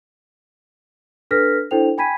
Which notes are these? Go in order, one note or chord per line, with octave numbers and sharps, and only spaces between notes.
D4 A4 B4 F6 A#6 B6
D4 E4 A4 C5 G5 F7
G5 G#5 B5 G#6 B6 D#7